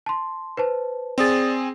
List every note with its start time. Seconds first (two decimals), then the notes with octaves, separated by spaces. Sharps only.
0.06 A5 C6
0.57 B4 C5 A5
1.18 C4 G#4 D5 D#6 A6